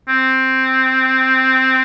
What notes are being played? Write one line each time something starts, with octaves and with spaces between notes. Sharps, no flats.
C4